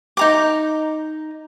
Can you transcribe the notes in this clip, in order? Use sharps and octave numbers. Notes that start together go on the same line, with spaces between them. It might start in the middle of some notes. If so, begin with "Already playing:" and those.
D#4 A#5 D6